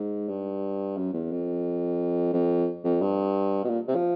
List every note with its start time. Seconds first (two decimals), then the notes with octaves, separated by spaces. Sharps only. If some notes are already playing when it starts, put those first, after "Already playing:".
Already playing: G#2
0.28 G2
0.97 F#2
1.13 E2
1.31 F2
2.33 F2
2.84 F2
3.01 G2
3.64 B2
3.70 A#2
3.88 C3
3.95 F3